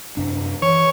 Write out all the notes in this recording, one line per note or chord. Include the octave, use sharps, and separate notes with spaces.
F#2 C3 D4
E3 C#5